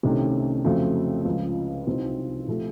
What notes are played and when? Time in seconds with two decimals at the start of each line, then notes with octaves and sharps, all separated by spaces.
0.03 C2 C3 D#3 A3 C#4
0.65 F2 C#3 F#3 A3 C4
1.25 C#2 C#3 F3
1.87 C2 C3 F#3 C4 D#4
2.48 C3 F3 A3